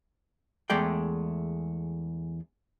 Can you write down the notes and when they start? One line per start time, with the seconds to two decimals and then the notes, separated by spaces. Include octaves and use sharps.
0.70 E2 G#3 A3 D5 G5